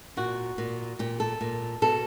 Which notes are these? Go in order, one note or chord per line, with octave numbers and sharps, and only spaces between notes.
A#2 F#4
A#2
A#2 G4
A4
A#2
B2 A4